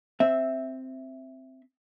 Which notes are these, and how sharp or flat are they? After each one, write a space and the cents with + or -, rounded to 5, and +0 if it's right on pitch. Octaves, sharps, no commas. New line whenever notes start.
C4 +0 E5 +0